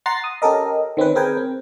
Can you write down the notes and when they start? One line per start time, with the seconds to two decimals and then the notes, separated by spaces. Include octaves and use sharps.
0.06 F#5 A#5 C6 A6 A#6 C7
0.24 D#6
0.42 C#4 G4 A4 A#4 D#5
0.97 D#3 C4 C#4 B4
1.15 C4 G#4 A#4 B4 G5 G#5
1.37 C4